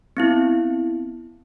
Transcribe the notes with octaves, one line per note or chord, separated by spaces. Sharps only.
B3 C4 E4